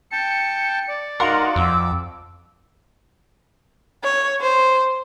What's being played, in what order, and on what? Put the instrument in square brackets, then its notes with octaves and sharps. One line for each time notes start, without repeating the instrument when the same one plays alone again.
[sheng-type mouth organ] G5 A5 [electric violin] C#7
[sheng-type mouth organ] D5
[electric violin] D#4 F#4 [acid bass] A#4 [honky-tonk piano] F5 F#5 C6
[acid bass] F2 [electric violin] D6 E6
[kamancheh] C#5
C5